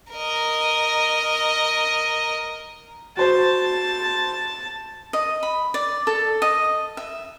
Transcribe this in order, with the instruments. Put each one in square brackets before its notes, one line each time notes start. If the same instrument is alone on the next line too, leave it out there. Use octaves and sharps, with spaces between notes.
[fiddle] A#4 D#5
[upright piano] F#4 C5 [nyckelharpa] A5
[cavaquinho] D#5
B5
D5
A4
D#5
E5